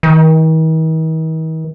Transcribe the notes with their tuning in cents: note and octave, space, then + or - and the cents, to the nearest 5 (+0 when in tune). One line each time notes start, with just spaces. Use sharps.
D#3 +45